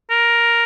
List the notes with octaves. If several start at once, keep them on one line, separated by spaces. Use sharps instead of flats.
A#4